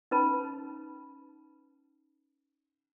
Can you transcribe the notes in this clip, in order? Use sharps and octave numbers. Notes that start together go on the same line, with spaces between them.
C#4 D#4 B4 A5 B5